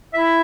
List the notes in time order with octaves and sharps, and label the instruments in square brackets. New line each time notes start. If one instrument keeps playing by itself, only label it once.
[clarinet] E4 [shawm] E5